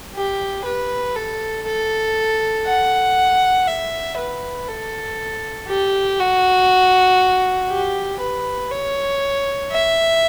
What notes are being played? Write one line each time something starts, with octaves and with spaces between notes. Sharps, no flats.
G4
B4
A4
A4
F#5
E5
B4
A4
G4
F#4
G4
B4
C#5
E5